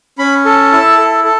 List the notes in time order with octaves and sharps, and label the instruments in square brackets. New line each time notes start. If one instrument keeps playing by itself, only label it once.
[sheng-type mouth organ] C#4 B5
A4
E4 A5
A4
A4